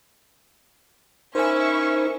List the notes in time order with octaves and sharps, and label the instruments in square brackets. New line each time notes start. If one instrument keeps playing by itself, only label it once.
[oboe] C#4 [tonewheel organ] D#4 A#4 [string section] E4 E5 C#6 [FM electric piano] C5 G#5